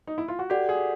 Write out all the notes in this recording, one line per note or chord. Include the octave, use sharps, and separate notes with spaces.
D#4
E4
F4
F#4
F#4 G4 A4 D5 F#5
G#4